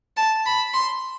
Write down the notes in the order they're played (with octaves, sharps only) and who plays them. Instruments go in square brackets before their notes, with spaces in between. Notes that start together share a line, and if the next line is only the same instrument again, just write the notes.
[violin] A5
B5
C6